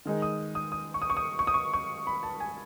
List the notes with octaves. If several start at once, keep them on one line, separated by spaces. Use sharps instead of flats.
D#3 G#3 D#4
D#6
D#6
D#6
C#6
D#6
C#6
D#6
C#6
D#6
C#6
C#6
B5
A5
G#5